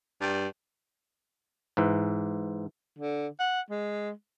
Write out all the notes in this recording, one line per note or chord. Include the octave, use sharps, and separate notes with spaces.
G2
G#2 E3
D3
F#5
G#3